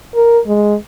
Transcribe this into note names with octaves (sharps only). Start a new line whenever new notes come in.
A#4
G#3